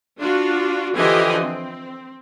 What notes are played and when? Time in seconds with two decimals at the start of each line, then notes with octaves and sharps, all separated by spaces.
0.20 D4 F4 F#4
0.96 D3 E3 F3 G4 D#5 G#5
1.41 C4